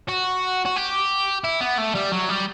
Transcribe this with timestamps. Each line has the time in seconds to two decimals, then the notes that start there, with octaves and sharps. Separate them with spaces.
0.09 F#4
0.65 F#4
0.76 G4
1.44 E4
1.61 B3
1.78 A3
1.95 G3
2.12 F#3
2.29 G3